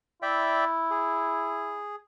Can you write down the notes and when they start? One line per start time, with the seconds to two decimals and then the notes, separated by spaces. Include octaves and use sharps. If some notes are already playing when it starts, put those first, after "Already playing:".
0.22 E4 D5 E5 G5
0.91 G#4